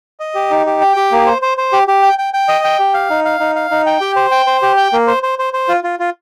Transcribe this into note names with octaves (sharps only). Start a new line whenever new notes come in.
D#5
G4
D#4
G4
G5
G4
A#3
C5
C5
C5
G4
G4
G5
G5
G5
D#5
G5
G4
F5
D#4
F5
D#4
F5
D#4
G5
G4
C5
G5
C5
G4
G5
A#3
C5
C5
C5
C5
F4
F4
F4